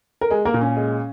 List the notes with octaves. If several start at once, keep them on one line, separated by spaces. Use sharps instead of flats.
A#4
G#3 G#4
A#3 A#4
A#2
C#4
G#3